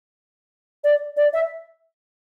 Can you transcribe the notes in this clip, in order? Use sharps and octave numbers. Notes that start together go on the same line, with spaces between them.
D5
D5
E5